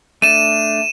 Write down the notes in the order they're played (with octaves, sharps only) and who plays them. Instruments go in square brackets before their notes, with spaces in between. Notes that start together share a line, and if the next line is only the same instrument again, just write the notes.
[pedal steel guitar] A3 D4 [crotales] D#7 E7